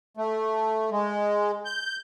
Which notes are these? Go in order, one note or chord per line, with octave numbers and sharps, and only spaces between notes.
A3
G#3
G6